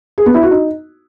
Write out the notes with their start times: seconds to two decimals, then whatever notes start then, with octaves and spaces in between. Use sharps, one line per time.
0.18 G#4
0.26 B3
0.34 E4
0.43 F#4
0.51 D#4